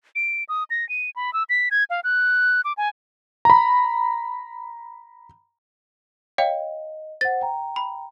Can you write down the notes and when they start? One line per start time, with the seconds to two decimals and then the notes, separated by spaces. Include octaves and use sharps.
0.15 D7
0.49 D#6
0.70 A#6
0.89 D#7
1.16 B5
1.33 E6
1.49 B6
1.71 G#6
1.90 F5
2.04 F#6
2.65 D6
2.77 G#5
3.45 A#5 B5
6.38 C#5 D#5 F5 G5
7.21 C5 F#5 A6
7.41 G5 A#5
7.76 B5